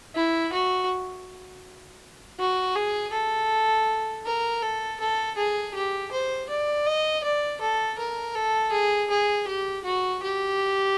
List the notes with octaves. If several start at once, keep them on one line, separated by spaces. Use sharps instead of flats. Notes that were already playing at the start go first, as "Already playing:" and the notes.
E4
F#4
F#4
G#4
A4
A#4
A4
A4
G#4
G4
C5
D5
D#5
D5
A4
A#4
A4
G#4
G#4
G4
F#4
G4